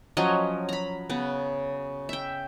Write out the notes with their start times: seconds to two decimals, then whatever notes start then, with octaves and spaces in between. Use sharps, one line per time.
0.17 F3 F#3 C#4 D#5
0.69 A#5 B5
1.10 C#3 B3
2.09 E5 G5